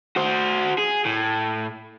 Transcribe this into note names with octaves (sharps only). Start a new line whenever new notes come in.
F#4 C5
G#4
A2